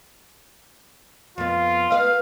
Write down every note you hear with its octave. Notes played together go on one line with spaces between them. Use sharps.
F2 B3 F4
B3 B4 D#5 F5